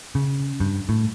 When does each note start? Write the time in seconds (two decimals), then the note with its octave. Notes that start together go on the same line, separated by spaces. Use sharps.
0.15 C#3
0.60 G2
0.89 A2